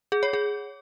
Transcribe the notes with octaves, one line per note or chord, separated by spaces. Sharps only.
G#4
C#5
G#4